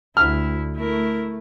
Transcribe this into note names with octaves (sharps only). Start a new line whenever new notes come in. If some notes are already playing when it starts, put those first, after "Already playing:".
D2 E4 F6
A3 E4 A#4